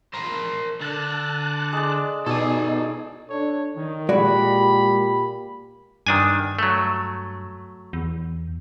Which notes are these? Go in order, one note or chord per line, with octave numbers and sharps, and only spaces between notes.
A#4 C5
D3 A5 F#6
G#3 D5
B2 D#4 A4 C#5 D5 G#5
D4 A4 C#5
D#3
A#2 G#3 F#4 G4 D5 B5
G2 D#3 D4 G#5
F#3 A3
E2